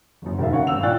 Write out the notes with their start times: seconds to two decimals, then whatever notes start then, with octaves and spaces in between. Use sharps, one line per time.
0.22 F#1 F#2
0.38 E1 D2 G#2 A#4 E5 F5
0.52 C#4 C#5 F5 F#5
0.67 G#1 G2 F5 E6 F7
0.83 A#2 C#5 D5 G5 F#6 A6